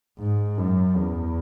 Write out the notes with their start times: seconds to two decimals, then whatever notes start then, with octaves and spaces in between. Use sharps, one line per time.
0.19 G#2
0.58 F#2
0.97 E2